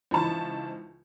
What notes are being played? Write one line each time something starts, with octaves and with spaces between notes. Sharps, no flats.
C#2 E3 F3 D#4 A5 C#6